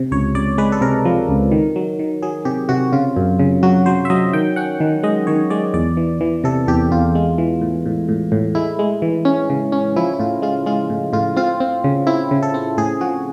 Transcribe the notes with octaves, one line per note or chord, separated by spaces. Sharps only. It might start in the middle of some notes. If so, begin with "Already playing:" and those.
Already playing: C3
C#2 C#5
C#2 D5
G#3 B4
A4
C3 A#4
F3
C#2
D#3
F#3
D#3
F#3 G#4
C3 G4
C3 F#4
C#3 F4
F#2
C#3
F#3 F#4
F#3 C5
E5
F#3 D#5
D#3 G5
C#4 F#5
D#3
G#3 D#5
D#3 C#5
G#3 D5
E2 D5
E3
E3
C3 A4
E2 G4
E2 F4
G#3
E3
A2
A2
A2
A2
G#3 E4
G#3
E3
C#4
C#3
C#4
F3 E4
E4
A2 F4
G#3 F4
G#3 F4
A2
A2 F4
C4 F4
C4
C#3
C4 E4
C#3
A4
C4
A2 G#4
F3 F#4